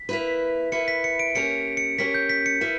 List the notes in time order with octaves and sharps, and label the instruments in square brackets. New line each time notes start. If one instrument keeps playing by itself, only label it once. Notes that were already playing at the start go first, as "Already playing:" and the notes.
Already playing: [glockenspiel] B6
[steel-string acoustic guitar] A#3 E4 B4
[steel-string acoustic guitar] A#3 E4 B4 [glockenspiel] C#7
[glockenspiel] B6
C#7
D7
[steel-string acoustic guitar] A#3 C#4 G4 A#4 [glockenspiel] C#7
[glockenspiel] C#7
[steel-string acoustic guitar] A#3 C#4 G4 A#4 [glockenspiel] B6
[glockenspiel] G6
B6
C#7
[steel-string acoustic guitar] A#3 E4 B4